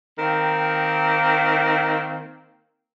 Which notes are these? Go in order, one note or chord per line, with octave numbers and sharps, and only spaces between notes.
D#3 A#3 C4